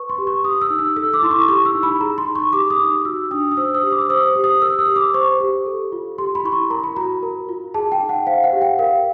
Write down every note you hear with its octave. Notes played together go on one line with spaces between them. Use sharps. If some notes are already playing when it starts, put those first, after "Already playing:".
Already playing: B4 C#6
C6
G4
C#6
G4 D#6
E6
D#4
E6
A4 E6
D6
E4 C6
C#6
G4 C#6
E6
D#4
B5
G#4 A#5
C6
D#4
C#6
G4 D6
D#6
D#4
F#4 E6
D4 D#6
D#6
C5 E6
D#6
G4
D6
E6
C5 D#6
G4
D#6
A#4 E6
D#6
G4
D6
C5 C#6
G4
A4
F4
G4 C6
B5
E4 C#6
C6
A#4 A#5
B5
F#4 A#5
A#4
F4
G#4 A5
G5
D#4
F#5
C5 F5
F#5
G4
G5
A#4 F5